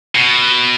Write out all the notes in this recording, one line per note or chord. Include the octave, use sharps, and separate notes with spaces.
B2